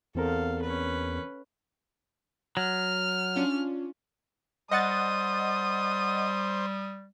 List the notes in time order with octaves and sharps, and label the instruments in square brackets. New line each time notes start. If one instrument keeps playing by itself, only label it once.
[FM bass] E2 [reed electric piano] E3 C4 A#4 [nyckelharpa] A4 F5
[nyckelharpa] C#4 B4
[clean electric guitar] F#3 [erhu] F6
[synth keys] C#4 D4 F4
[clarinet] G3 [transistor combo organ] C5 [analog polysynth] D#5 F#5 A6 [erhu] D#6